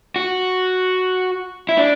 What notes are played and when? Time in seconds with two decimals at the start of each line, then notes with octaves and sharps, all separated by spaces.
0.16 F#4
1.69 E4
1.78 D4